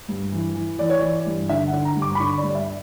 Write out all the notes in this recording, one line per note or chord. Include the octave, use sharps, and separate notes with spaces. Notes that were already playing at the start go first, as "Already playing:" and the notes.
G2
E3
E3
E3 D5
C#5
E3 D5
G2
D3 E5
F#5
D3
A#5
G2
D6
B5
D3 C#6
D5
G2
D5
E5